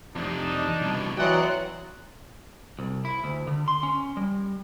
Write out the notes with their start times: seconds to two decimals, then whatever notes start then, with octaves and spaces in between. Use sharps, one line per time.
0.16 F2 C3 D4 D#4
0.82 C2 B2
1.17 E3 F#3 D5 D#5 F#5 G5 C6
2.79 C2
3.05 E4
3.24 D2
3.47 D3
3.68 C6
3.83 C#4
4.17 G3